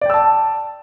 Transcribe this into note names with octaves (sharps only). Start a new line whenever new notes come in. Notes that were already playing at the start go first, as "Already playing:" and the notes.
D5 G5 A5 E6